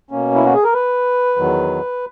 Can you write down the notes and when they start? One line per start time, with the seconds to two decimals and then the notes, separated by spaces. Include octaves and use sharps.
0.11 B2 A#3 C#4
0.35 E4
0.44 F#4
0.54 G#4
0.64 A#4
0.73 B4
1.37 E2 D#3 F#3